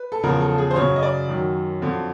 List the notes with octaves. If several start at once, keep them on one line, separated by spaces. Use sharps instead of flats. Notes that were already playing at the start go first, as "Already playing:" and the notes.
Already playing: B4
A4
E2 C#3 F3 A#4
A4
G#4
C5
F#2 C#3 F#3 C#5
D#5
D5
F#2 D#3 F#3
F2 D3 F#3